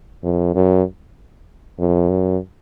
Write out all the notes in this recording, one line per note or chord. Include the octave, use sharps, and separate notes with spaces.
F2
F#2
F2
F#2